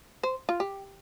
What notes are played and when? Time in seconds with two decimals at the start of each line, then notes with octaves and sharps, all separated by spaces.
0.23 C5
0.49 F4
0.60 G4